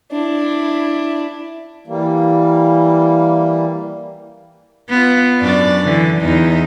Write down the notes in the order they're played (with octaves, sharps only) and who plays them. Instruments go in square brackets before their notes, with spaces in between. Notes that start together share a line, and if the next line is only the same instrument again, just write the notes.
[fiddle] D4 E4
[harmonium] E3 G3 A#3
[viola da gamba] B3 F4
F#2 D4 D5
D3 E3
E2 D#4